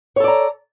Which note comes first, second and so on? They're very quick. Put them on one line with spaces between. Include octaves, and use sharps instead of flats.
C#5 A4 D5 A#5